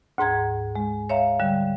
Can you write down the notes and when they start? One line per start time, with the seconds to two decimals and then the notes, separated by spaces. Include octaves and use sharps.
0.18 D2 G#2 A#5 G#6
0.76 G#3
1.09 C#5 E5 F5 A#5
1.40 D3 G3